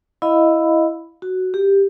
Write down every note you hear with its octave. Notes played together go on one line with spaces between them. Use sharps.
E4 D#5 F5 B5
F#4
G4